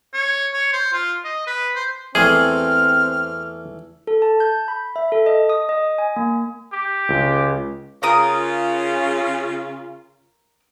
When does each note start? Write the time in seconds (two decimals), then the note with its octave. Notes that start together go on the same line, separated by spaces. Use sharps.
0.14 C#5
0.54 C#5
0.73 C5
0.93 F4
1.25 D#5
1.47 B4
1.76 C5
2.15 E2 A3 C4 G#4 F6
4.07 A4
4.22 A5
4.40 G6
4.68 B5
4.96 E5
5.12 A4
5.26 D#5
5.49 D#6
5.69 D#5
5.98 G#5
6.16 A#3
6.73 G4
7.09 C#2
8.03 C#3 F4 A#4 D#6